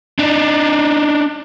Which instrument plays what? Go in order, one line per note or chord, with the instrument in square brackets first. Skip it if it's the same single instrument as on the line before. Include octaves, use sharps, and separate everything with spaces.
[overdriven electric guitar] D4 D#4